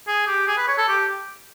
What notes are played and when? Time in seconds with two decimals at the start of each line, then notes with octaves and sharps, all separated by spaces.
0.07 G#4
0.27 G4
0.47 G#4
0.57 B4
0.68 C#5
0.78 A4
0.88 G4